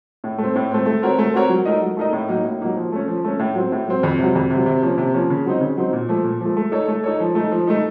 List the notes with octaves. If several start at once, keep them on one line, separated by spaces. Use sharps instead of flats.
A2
A3
C4
A2
A3 C4
A3
C4 F#4 A#4 C#5
A3
C4 F#4 A#4 C#5
F#3
A3 D#4 A#4 D#5
F#3
A3 D#4 A#4 D#5
A2
F#3 A#3 D#4
A2
F#3 A#3 D#4
F3
A3 C#4
F3
A3 C#4
A2
F#3 C4
A2
F#3 C4
F2
C3 F#3
F2
C3 F#3
C3
F3 A#3 C#4
C3
F3 A#3 C#4
C#3
F#3 C4 D#4
C#3
F#3 C4 D#4
A#2
F3 A3
A#2
F3 A3
A3
D#4 A4 C#5
A3
D#4 A4 C#5
F3
A3 D#4
F3
A3 D#4